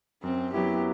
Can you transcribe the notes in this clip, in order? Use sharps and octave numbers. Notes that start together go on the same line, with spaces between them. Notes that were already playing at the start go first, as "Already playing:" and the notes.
F#2 C4
F#3 B3 E4 G4